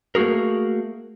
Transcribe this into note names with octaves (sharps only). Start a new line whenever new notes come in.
A3 A#3 F#4 G#4 A#4